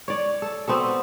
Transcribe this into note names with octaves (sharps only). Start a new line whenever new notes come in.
C#5 D5
A4
B3 C4 F#4 A4